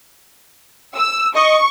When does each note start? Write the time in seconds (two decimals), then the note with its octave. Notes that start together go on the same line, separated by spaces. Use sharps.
0.96 E6
1.35 D#5 C#6